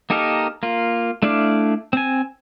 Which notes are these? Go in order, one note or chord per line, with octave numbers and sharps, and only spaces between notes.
A#3 D#4 G4 A4 A#4
A#3 F4
A3 D4 E4 D5 F5
C4 G#5